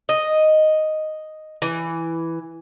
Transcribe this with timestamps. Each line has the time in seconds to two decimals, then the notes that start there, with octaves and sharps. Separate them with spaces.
0.09 D#5
1.62 E3